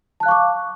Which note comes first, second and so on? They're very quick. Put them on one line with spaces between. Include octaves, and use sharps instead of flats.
A5 F#6 F5 C#6 D6